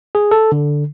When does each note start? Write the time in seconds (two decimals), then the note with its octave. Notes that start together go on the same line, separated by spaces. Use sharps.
0.15 G#4
0.31 A4
0.52 D3